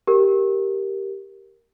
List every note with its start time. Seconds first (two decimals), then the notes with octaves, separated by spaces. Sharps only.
0.07 G4 A#4